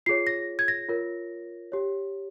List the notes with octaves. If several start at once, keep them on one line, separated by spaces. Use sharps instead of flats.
F4 G#4 C#5 C7
A#6
G#6
A#6
F4 A#4 C#5
G4 C#5